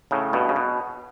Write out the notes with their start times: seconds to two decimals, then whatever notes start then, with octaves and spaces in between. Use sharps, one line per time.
0.11 A2 C#3
0.33 G2 B2
0.49 C#3
0.56 B2